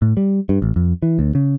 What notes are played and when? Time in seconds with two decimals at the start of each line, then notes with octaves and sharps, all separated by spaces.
0.02 A2
0.17 G3
0.49 G2
0.62 A1
0.76 F2
1.02 E3
1.19 D2
1.35 C#3